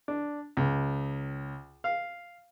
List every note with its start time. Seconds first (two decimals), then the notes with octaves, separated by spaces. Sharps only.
0.08 D4
0.57 C#2
1.84 F5